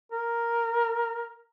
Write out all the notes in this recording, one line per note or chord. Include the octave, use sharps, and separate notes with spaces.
A#4